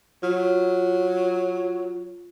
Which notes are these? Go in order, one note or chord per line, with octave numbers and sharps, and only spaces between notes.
F#3 F4